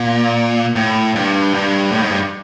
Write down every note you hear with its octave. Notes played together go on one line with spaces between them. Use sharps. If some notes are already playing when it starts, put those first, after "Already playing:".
Already playing: A#2
A2
G2
G2
A2
G#2
G2